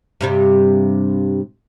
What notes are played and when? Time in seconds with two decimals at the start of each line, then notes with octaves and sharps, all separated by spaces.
0.21 G2 C3 G3